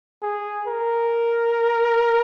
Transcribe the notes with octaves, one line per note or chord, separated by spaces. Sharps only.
G#4
A#4